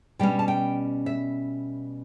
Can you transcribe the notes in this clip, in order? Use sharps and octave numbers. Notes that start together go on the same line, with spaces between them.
B2 G3 C#4 G5
A5
G5
E5